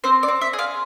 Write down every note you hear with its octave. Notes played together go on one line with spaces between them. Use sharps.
C4 C5
D5
C4
E5
G#4
F5